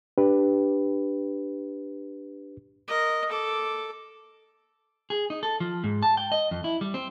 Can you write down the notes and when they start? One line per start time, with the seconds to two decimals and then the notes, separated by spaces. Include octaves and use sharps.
0.18 D4 G4 B4
2.88 A#4 D#5
3.29 A4 D6
5.10 G#4
5.30 D#4
5.43 A4
5.60 F3
5.84 G#2
6.03 A5
6.17 G5
6.32 D#5
6.51 F2
6.64 E4
6.81 G3
6.94 C4